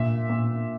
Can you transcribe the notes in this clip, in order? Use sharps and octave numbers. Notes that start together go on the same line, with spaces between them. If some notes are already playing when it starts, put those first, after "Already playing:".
Already playing: A#2 E5
A#2